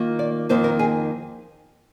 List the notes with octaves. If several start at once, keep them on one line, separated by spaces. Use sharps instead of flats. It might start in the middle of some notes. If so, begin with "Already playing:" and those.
Already playing: D#3 A#3 F4
D5
F2 D#3 A#3 C5
A#4
G#4